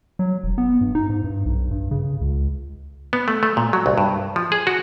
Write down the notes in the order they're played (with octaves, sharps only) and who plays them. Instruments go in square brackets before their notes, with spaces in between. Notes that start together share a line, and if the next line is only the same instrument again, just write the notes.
[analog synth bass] F#3
E1
B3
G2
D#4
G#2
G2
B1
G2
C#3
C#2
[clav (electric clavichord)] B3
A3
A3
A#2
F#3
C2
G2
F3
G#4
F#4